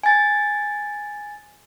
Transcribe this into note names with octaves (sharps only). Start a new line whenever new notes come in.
G#5 A6